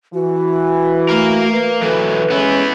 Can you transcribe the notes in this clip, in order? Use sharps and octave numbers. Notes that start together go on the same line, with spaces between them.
E3 F#4
A3 A#4 F5
B4
E3 F#3 A4 B4
G#3 B3 C#4 E4